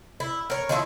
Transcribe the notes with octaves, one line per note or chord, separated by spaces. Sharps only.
E4
A#4 C#5
D#3 F3 A3 E4